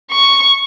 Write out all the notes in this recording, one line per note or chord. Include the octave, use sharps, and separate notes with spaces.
C#6